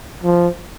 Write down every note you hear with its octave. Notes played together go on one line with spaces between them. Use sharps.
F3